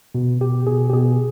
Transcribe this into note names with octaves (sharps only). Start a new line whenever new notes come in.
B2
B2 G4
B2 G#4
G4
B2 G#4